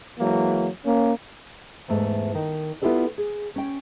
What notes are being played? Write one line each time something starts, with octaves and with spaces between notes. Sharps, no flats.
E3 F#3 G#3 A#3
A#3 C#4
E2 G#2 A3
D#3
B3 E4 F4 G4 A4 D5
G#4
C#4 G5